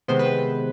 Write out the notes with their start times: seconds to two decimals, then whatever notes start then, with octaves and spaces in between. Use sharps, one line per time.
0.08 C3 D#3 G#3 B3 C5
0.19 B4